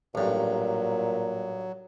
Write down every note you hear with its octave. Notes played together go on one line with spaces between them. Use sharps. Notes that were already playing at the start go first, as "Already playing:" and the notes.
A1 G2 A#2 F#3